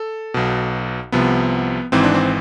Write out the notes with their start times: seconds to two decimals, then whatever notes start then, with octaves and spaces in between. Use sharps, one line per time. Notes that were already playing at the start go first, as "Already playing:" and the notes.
Already playing: A4
0.34 B1 B2
1.12 C2 C3 F3 B3
1.92 G#1 G#2 E3 C4
2.04 D4
2.14 C4